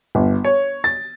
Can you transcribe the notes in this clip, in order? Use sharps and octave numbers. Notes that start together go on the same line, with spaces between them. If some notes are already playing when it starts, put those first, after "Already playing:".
G1
C#5
A6